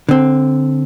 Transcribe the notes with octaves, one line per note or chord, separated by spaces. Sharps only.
D3 C4